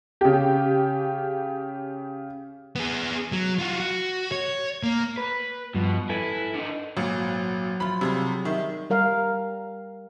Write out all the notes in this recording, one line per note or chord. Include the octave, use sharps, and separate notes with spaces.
C#3 G4
B3 G#4
F#3
F4 F#4
F#4
C#5
A#3
B4
G2 B2 F3
E4 A4 B4 G#5
D3 D#4
G#1 A#2 F#3
F3 F4 B5
C3 G3 G#4 F5
D#3 E5
G3 A#4 F5